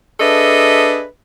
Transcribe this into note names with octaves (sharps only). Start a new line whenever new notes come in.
D4 G#4 A4 B4 D#5 E5